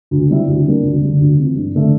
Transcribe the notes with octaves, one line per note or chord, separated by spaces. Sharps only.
D2
C3 G3 C4 E4
D2
C3 G3 A#3 D4
D2
D3 G3
D2
C3 E3
G2
D3 A3